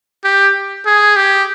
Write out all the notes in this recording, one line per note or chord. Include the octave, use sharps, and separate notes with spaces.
G4
G#4
G4